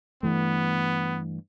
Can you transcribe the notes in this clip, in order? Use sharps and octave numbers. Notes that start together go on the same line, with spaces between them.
G2 E3 A3 B3